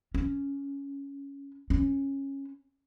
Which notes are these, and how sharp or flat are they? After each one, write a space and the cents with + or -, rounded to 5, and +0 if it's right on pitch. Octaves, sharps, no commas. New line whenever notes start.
C#4 +10
C#4 -15